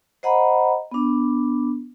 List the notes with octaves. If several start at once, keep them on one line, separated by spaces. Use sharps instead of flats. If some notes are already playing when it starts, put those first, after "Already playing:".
C5 D#5 F#5 A#5 B5
B3 D4